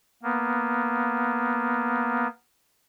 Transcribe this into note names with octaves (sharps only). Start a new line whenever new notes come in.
A#3 B3